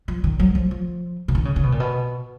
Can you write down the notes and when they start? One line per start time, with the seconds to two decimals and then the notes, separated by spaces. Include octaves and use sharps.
0.08 F3
0.24 D#3
0.39 F#3
0.55 F3
0.71 F3
1.28 C#3
1.35 D#3
1.45 C#3
1.56 C#3
1.63 B2
1.72 A#2
1.80 B2